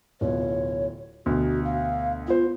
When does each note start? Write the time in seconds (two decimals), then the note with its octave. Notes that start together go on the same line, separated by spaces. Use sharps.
0.21 D1 B2 F4 C#5
1.26 D2 B2 F#4
1.65 F5
2.28 B3 F4 C5